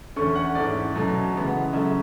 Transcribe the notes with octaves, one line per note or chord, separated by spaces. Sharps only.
E2 D3 A3 C#4 C#6
F#5
G#2 E3 A3 C#4 D5
B2 F#3 A3 C#4
C#3 E3 G#3 B3
C#3 F#3 A3 C#4 E5